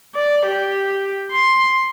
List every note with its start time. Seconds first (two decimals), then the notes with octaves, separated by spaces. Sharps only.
0.16 D5
0.46 G4
1.32 C6